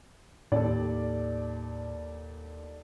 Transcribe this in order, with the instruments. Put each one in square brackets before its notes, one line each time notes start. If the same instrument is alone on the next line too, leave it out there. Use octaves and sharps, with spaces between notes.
[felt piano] D#2 [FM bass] A2 [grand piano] A4 D5